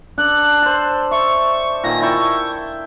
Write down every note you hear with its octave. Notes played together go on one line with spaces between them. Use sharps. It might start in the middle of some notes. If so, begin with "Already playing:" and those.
D4 A4 F#6
A4 C5
E5 C#6
A#2 D#3 G#5 A#6
E4 G5 A5 C#6